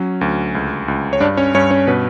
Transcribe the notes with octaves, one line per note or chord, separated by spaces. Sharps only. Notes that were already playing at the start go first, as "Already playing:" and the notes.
Already playing: F#3 C#4
D2
C#2
C#2
C#5
G2 D4 D5
C#4 C#5
G2 C#4 C#5
C#4 C#5
B2 B4